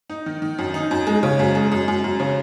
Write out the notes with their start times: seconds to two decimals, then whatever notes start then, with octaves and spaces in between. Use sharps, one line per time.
0.10 D#4
0.26 D#3
0.42 D#3
0.58 F#2
0.74 D#4
0.91 F#2
1.07 G#3
1.23 C#3
1.39 F#2
1.55 G#3
1.72 F#2
1.88 F#2
2.04 F#2
2.20 C#3